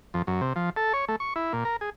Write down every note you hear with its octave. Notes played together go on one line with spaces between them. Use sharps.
F2
F#2
C3
F3
A4
C#5
A3
C#6
E4
A#2
A#4
G#4